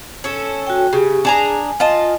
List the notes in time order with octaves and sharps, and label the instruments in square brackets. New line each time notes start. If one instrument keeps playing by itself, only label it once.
[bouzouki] C#4 A4
[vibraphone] F#4 G5
[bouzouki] C#3 [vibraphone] G4
[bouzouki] D4 G#4 A#5 [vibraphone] G#5
[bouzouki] F4 D#5 A5